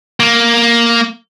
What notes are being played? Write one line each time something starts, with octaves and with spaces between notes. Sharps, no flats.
A#3